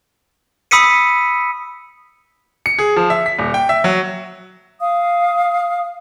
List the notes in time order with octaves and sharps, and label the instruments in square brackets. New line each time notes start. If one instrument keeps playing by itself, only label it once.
[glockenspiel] B5 D#6 E6 B6 C#7 D#7
[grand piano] C#7
G#4
F3
E5
B6
D#1
G5
E5
F#3
[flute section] F5 D#6